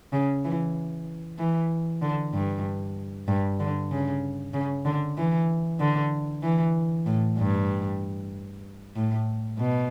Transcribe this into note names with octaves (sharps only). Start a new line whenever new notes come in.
C#3
E3
E3
D3
G2
G2
D3
C#3
C#3
D3
E3
D3
E3
A2
G2
A2
B2